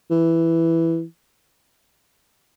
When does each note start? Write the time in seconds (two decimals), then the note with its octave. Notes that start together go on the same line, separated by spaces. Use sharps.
0.10 E3